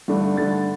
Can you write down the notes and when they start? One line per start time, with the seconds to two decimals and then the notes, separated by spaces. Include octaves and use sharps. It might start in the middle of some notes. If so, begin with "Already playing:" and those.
0.08 G2 D3 A3 D4
0.37 G2 D3 A3 D4 A6